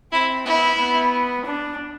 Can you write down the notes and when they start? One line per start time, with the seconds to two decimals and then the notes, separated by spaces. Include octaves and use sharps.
0.12 C4 E4
0.45 B3 E4
0.79 B3
1.45 D4